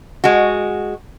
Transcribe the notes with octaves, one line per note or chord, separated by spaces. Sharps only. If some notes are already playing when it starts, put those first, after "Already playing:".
G#3 F#4